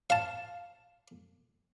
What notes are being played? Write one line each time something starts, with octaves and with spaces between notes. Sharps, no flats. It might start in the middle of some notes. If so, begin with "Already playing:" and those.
F5 A5